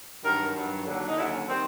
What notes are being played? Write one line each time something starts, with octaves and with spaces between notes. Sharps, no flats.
G2 D#3 F#3 A#4
G2 D#3 F#3
D#2 D3 F#3
D#4
D#2 D3 F#3 E4
C#4
D#3 G3 C4